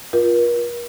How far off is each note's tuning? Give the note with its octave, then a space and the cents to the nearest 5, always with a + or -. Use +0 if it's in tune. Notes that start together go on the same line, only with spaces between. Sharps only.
F4 +0 A#4 +45